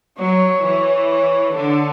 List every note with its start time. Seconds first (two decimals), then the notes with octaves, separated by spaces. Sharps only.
0.18 F#3 C#5
0.64 E3
1.10 C#5
1.55 D3 A4